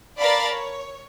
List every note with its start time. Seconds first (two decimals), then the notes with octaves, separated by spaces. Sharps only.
0.19 A#4 D5 F5 A5 B5 A6
0.56 C#5